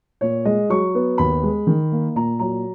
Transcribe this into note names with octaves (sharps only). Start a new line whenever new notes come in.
A#2 C#5
G#3 D#5
F#3 C#6
B3
D#2 B5
G#3
D#3
A#3
A#2 A#5
F#3 A#5